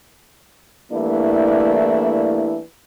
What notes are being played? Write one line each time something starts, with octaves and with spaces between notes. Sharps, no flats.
E3 G3 A3 A#3 D4 E4